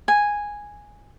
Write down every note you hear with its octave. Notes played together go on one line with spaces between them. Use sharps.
G#5